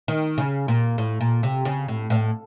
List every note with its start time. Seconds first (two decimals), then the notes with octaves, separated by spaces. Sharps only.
0.08 D#3
0.38 C#3
0.68 A#2
0.98 A2
1.21 A#2
1.43 C3
1.65 C#3
1.88 A2
2.10 A2